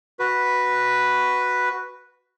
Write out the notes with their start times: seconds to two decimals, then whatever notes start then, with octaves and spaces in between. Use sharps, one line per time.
0.19 F#4 B4